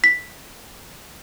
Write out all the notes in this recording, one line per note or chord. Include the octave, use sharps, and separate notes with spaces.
B6